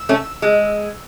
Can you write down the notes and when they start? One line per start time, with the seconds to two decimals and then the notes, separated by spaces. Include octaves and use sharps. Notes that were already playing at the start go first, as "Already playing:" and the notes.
Already playing: E6
0.09 A3 C#4
0.42 G#3